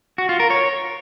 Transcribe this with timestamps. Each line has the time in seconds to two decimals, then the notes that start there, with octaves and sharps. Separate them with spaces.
0.18 F#4
0.29 F4
0.40 A#4
0.50 C#5